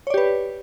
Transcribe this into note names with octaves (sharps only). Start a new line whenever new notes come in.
G4 B4 C#5 D5